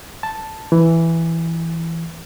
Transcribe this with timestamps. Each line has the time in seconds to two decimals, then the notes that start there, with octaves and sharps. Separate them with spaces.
0.23 A5
0.72 E3